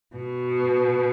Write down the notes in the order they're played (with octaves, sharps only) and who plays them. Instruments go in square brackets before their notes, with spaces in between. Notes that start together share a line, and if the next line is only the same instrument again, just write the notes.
[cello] B2